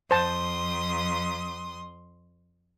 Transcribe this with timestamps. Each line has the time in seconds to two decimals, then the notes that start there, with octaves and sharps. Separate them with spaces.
0.11 F2 C5 A5 C6 D#6